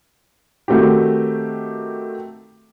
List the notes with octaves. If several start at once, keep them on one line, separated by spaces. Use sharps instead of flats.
D#3 A3 C4 F#4 G4